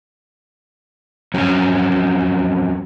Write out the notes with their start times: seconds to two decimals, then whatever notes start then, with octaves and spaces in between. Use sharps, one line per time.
1.34 F2 F#3 C#4